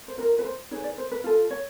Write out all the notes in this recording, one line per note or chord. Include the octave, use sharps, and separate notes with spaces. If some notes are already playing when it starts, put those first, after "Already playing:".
C5
F4 A#4 B4
B4
C5
D#4 G#4 B4 C#5
D5
C5
B4
F4 A4
C#5